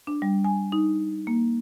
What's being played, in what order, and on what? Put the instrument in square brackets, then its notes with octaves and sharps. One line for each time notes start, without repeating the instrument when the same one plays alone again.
[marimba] D4
G3
G#5
D#4
A#3